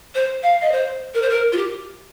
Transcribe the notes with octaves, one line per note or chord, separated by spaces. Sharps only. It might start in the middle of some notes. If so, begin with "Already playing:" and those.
C5
F5
D#5
C5
A#4
C5
A#4
F4
G4